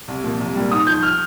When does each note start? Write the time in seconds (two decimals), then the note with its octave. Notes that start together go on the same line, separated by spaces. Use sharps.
0.08 C2
0.23 A#2 F3
0.39 C2
0.55 A#2 G3
0.71 G#2 D#6
0.87 F3 G6
1.03 F6